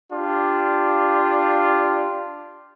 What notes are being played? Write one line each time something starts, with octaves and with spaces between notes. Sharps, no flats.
D4 F4 G4